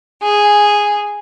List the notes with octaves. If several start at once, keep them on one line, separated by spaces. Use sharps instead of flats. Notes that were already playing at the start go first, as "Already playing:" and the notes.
G#4